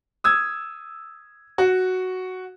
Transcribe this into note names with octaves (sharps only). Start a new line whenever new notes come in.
D#6 E6 G#6
F#4